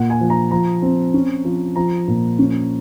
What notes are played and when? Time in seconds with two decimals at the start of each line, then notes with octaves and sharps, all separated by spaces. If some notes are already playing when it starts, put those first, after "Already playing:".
Already playing: A#2 F#5
0.10 G#5
0.21 F3
0.30 A#5
0.51 F3 A#5
0.82 C4
1.14 C#4
1.45 F3
1.76 F3 A#5
2.08 A#2
2.39 C#4